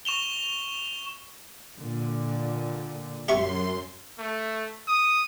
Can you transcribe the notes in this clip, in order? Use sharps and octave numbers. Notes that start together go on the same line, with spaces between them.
C#6 E7 F7 G7
A#2 D3
F#2 G4 E5 C6 C#6
A3
D#6